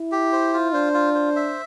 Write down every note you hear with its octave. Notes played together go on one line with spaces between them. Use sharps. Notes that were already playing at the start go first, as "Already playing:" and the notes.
Already playing: E4
G4
C5
F4
D4 C5
F4
C5
E5